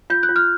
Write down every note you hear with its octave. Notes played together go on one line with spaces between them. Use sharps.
F4 G6
F#6
F4
F6